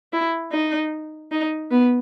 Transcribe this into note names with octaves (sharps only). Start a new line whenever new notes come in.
E4
D#4
D#4
B3